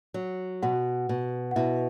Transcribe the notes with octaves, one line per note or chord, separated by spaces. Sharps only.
F#3
B2 F#4 F#5
B2
F#5
B2 E4 E5